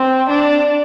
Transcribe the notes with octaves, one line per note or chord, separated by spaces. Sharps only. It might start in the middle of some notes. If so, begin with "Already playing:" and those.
Already playing: C4
D4